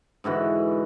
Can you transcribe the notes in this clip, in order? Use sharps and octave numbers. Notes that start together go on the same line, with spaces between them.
G#2 D3 E3 F#4